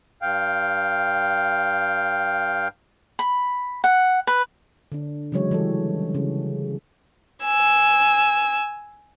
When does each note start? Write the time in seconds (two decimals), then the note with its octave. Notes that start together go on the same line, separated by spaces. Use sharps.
0.22 G2 F5 G5
3.19 B5
3.84 F#5
4.27 B4
4.92 D3 D4
5.32 C#3 E3 F#3 G#3 C#5
5.51 E3 G3 G4 A4
6.15 C#3
7.45 G#5 E6